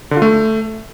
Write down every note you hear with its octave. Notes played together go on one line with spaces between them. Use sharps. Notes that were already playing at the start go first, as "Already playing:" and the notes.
D3
F4
A3